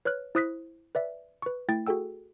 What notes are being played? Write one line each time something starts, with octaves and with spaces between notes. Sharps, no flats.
B4 C#5 F6 F#6
E4 C5 D#6 F#6 A#6 B6
B4 D5 E5
B4 C#6
A3 E4 G5 A6
F#4 G#4 A4 G5 E6